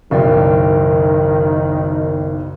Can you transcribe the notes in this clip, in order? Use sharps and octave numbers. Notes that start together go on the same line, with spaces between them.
F#1 B1 D#3 A#4 D5 G5